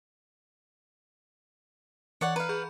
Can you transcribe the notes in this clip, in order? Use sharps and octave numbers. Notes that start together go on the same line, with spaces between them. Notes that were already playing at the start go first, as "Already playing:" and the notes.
E3 C#5 D5 F#5 C#7
B4 F5 A#5
G#4 B5 G6